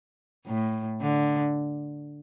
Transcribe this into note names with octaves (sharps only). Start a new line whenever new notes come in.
A2
D3